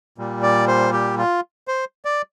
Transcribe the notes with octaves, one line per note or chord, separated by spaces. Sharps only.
A#2 G3
D5
C5
G4
F4
C5
D5